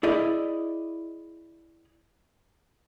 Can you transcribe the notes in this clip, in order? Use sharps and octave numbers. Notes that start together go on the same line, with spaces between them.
E4 G#4 D5 D#5